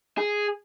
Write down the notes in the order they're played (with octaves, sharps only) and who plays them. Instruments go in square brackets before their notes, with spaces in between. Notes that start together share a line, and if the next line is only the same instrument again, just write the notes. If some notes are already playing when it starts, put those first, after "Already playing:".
[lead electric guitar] G#4